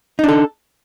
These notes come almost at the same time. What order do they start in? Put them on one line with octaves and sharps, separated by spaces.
D#4 D4 A4